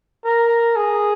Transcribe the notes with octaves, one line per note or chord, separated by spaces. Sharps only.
A#4
G#4